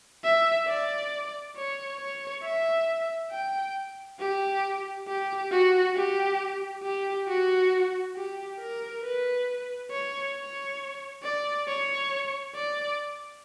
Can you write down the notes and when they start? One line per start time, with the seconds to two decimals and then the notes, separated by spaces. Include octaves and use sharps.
0.24 E5
0.67 D5
1.56 C#5
1.99 C#5
2.43 E5
3.31 G5
4.19 G4
5.07 G4
5.51 F#4
5.95 G4
6.83 G4
7.28 F#4
8.16 G4
8.59 A#4
9.03 B4
9.91 C#5
10.35 C#5
11.23 D5
11.67 C#5
12.55 D5